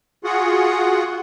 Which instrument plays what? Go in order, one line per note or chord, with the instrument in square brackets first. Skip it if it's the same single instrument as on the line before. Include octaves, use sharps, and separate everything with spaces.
[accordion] F4 F#4 G#4 F#5